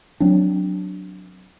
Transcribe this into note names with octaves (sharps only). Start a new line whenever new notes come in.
F#3 C4 D4